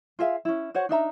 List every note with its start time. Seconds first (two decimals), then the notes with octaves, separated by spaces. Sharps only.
0.19 F4 G#4 E5 F5
0.45 C#4 E4
0.75 F#4 C5 C#5 F#5
0.89 D4 D#4 E5 A#5